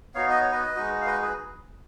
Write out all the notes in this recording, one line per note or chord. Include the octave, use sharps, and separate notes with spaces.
B3 D#4 F#4 C#5 F5
D#5
C#5
B4 D#5
G#3 D#4 F#4
F5
B4 D#5
G#4 B4